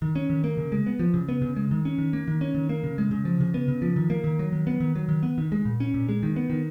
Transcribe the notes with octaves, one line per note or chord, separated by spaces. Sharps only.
D#3
C#4
D#3
A#3
C#3
G#3
B3
F3
C#3
B3
C#3
G#3
D#3
C#4
D#3
A#3
D#3
C#4
D#3
A#3
C#3
G#3
C#3
F3
C#3
B3
C#3
F3
D#3
A#3
D#3
F#3
D#3
B3
D#3
F#3
D#3
B3
D#3
G#3
A#2
C#4
A#2
G#3
D#3
B3
D#3